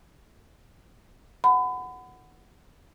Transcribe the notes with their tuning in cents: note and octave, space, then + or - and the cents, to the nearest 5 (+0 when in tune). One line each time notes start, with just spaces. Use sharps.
F#5 +0 B5 +30